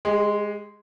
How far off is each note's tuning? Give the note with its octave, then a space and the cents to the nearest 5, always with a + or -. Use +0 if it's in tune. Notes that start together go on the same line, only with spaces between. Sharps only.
G#3 +0 G4 +40